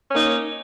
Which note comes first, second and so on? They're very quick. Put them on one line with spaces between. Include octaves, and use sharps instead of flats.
C#4 A#3 D#4